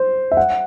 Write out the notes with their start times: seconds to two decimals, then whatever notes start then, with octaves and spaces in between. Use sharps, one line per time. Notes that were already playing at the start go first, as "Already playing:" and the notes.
Already playing: C5
0.32 E5
0.37 F#5